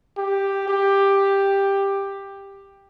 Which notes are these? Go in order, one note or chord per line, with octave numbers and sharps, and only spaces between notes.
G4
G4